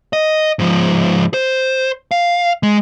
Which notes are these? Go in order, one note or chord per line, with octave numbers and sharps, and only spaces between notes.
D#5
G#2 F3
C5
F5
G#3